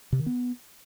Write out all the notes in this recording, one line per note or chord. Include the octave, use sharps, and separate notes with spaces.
C3
D#3
B3